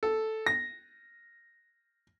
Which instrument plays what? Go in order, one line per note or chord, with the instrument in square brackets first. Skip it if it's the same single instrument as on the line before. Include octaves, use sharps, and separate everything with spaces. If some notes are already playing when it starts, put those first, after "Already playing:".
[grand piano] A4
A#6